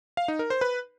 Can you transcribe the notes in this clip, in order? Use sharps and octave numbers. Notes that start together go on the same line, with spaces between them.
F5
D#4
A#4
C5
B4